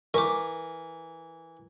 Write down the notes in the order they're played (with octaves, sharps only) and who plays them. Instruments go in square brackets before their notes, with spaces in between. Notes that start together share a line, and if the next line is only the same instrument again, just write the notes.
[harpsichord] E3 [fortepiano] A#4 [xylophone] C#6 D6